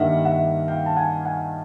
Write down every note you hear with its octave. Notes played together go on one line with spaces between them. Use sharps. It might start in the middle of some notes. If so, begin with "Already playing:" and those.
Already playing: G2 D#3 G3 A#3 D4 E5 F#5
E5 F#5
F5 G5
A5
F#5 G#5
F#5 G#5